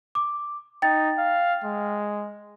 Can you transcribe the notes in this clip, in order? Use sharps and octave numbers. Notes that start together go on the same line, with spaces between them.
D6
D#4 G5 A6
F5
G#3